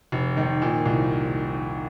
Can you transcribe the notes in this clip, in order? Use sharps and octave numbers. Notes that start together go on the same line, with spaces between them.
F1
D#3
A#2
C2